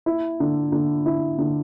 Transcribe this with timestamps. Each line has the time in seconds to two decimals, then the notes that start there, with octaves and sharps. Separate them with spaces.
0.06 E4
0.40 D3
0.72 D3
1.06 E4
1.38 D3